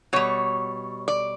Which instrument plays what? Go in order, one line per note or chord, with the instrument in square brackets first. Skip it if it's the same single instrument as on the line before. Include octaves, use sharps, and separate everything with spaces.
[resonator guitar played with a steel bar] B2 G3 C#5
D5